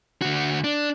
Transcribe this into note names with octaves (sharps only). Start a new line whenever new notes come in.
D3 F#4
D4